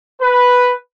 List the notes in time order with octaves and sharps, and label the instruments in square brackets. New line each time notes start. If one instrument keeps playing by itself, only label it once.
[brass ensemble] B4